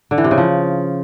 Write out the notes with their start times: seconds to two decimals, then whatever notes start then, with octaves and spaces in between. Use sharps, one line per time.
0.11 D3
0.18 E3
0.24 C3
0.31 C#3
0.38 F3